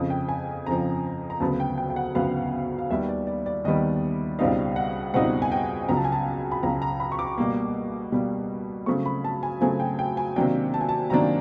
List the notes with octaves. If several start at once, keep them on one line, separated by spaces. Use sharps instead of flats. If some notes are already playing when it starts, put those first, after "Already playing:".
Already playing: F2 C#3 F3
G5
G#5
F2 C#3 F3 A#5
A#5
D2 C#3 F#3 B3 A5
G5
G5
G5
F#5
D2 C#3 F#3 B3 F5
F5
D#2 D#3 G3 B3 E5
D5
D5
D5
D#2 D#3 G3 B3 D#5
C#2 B2 G3 C4 D#4 F5
F#5
C#2 B2 G3 C4 D#4 F#5
G#5
G5
C#2 C#3 F#3 A#5
A5
G#5
A5
B5
C#2 C#3 F#3 A#5
A#5
B5
C#6
D6
B2 G3 A#3
B2 G3 A#3
C#3 F#3 A3 C4 C#6
B5
A5
G#5
C#3 F#3 A3 C4 G#5
G5
G5
G#5
C3 D#3 F#3 A#3 D4 G5
A5
G#5
A5
C3 D#3 F#3 A#3 D4 A#5